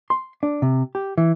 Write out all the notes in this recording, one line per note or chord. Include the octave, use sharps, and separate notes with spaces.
C6
D4
C3
G4
E3